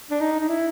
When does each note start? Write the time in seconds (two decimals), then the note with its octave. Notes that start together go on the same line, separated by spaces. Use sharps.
0.11 D4
0.21 D#4
0.40 D#4
0.49 E4